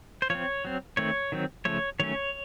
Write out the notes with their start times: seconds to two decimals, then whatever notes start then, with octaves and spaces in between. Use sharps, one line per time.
0.22 C5
0.30 F3 C4 C#5
0.65 F#3 C4
0.97 D#3 A3 C4 C#5
1.32 D#3 F#3 C4
1.65 C#3 F3 A3 C#5
2.00 D#3 F#3 A3 C#4 C#5